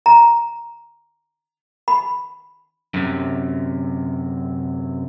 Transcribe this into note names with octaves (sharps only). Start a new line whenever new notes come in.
A#5
B5
F#2 C3